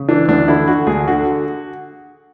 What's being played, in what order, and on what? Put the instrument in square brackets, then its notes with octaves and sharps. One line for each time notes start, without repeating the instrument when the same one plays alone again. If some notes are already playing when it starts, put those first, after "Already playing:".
Already playing: [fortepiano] C#3
E3 D4
D2 D4
D3 E4
D3 F#4
D2 G#4
D3 F#4